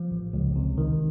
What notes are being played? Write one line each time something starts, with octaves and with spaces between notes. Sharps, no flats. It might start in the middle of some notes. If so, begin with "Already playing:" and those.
Already playing: F3
A1
C#2
C3
D#3